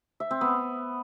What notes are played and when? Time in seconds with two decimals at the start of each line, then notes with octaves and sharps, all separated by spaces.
0.20 E5
0.31 C4
0.41 B3